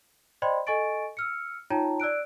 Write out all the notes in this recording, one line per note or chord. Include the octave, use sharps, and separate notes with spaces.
C5 D5 D#5 G5 B5 C6
A4 D#5 G#5 C#6 A6 D7
E6 F6 C#7
D#4 F4 C#5 G5 A5 A#5
D5 E6 F#6 D7